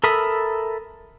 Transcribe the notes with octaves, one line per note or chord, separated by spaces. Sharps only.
A4 A#4 E5 B5 D#6